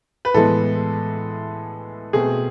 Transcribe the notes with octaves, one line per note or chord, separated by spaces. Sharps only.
B4
A2 E3 G#3 B3 A4
B2 A3 C4 G#4